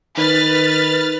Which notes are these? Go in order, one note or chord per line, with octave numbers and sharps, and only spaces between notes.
D#3 B4 F6 A6